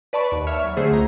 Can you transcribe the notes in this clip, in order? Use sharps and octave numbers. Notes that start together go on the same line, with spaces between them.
B4 D5 A5 B5 C#6
D#2
C#5 E5 F6
F#3 C#6
D3 A3 G#4 C5
C#2 A#5